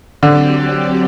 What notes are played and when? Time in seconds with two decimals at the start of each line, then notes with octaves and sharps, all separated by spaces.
0.23 D3 F#3 C4 G4 D5